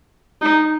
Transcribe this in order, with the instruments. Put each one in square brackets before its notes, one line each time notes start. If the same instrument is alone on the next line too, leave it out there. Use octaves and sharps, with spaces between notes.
[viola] D#4